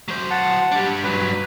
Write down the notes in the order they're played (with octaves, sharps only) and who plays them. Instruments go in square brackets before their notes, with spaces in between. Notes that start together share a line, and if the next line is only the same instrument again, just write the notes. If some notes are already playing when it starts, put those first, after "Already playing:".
[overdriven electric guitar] F#3 C5
[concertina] F#5 A5
[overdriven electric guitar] G3 D4
[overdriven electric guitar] G2 F#3 [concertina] B4